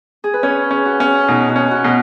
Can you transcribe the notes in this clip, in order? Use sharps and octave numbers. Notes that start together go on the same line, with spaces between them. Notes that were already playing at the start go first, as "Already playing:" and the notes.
G#4
B4
C#4 C#5
C#4
F#4
C#4
B2 D#4
F#4
C#4
F#4
B2